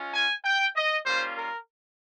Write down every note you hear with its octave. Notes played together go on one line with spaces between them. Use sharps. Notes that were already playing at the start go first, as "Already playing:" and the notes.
Already playing: G#3 C#4 F4
G#5
G5
D#5
G3 A#3 C#4 F4 C5
A#4